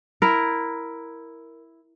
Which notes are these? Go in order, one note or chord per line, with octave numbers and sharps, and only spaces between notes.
E4 A#4